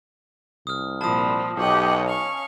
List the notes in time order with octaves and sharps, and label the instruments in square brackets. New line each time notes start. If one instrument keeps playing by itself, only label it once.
[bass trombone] C2 [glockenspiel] D#6 F6
[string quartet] A#2 F3 [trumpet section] C4 D4 B5 [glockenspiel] A5 D#6
[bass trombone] B1 [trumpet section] G4 [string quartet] C#5 D#5 F#6
[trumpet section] C#4 [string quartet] F5 C#6